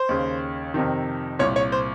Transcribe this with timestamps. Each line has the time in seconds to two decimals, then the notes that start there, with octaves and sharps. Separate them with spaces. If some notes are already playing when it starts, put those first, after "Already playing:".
Already playing: C5
0.09 D#2 C#3
0.74 F2 C3 D#3
1.39 C2 A#2 C#5
1.56 C#5
1.72 C5